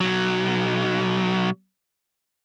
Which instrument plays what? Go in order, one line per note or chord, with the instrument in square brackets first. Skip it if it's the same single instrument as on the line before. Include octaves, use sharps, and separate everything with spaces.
[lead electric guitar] B1 F#3